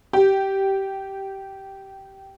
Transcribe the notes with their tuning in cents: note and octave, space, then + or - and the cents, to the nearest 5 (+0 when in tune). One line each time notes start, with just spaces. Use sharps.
G4 -15